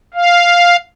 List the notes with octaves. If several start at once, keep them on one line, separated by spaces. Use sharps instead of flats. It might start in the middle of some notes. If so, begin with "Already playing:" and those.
F5